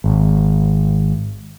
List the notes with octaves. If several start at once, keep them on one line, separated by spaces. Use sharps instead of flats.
G#1